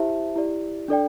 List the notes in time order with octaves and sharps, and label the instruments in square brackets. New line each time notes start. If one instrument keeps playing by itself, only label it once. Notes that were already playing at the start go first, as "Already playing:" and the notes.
Already playing: [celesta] E4 G4 C5 E5 A5
E4 G4 D5
D4 A4 D5 G5